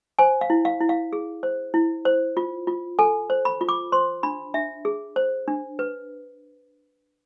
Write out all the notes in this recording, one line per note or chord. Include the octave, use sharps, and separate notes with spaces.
C5 G#5
F5
E4
F5
E4
F5
G#4
C5
E4
C5
F4
F4
A4 G#5
C5
B5
F4
D6
C5 C6
D4 B5
D4 E5
G#4
C5
D4
B4